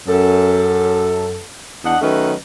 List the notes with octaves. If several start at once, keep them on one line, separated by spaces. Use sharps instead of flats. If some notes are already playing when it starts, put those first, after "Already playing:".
F#2 A4
E2 D4 D#5 F#5
D#3 F#3 A3 C#4 B4 D#5